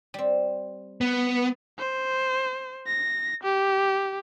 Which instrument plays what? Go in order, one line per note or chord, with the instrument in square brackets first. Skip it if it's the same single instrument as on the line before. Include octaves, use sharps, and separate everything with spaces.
[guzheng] G3 C4
[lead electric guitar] B3
[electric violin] C5
A#6
G4